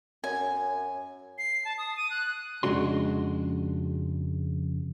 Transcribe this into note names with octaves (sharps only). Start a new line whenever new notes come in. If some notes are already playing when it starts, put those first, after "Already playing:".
F#2 G#5
C7
A5
D#6
D#7
F#6
F2 C#3 G#3 D4 F#4 C6